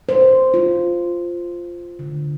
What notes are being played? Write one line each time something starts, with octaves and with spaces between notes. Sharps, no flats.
C5
F4
D3